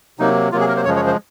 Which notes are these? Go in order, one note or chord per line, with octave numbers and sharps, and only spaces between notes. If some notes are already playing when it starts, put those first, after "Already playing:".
C3 F#3 A#3 D#4
C3 F#3 A#3 F4
G#4
A#4
C5
F#2 C#3 F3 G#3 C#5
C#5
C5